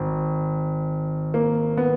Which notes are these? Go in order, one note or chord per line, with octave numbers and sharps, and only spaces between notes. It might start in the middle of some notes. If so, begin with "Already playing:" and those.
Already playing: G#1
A#3
B3